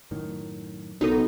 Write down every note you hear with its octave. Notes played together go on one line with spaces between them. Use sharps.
F#2 A2 D#3
B1 C#3 B3 D#4 F#4 A4